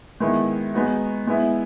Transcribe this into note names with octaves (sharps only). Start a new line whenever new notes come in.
D#3 G#3 B3 E4
G#3 B3 D#4 F#4
G#3 B3 E4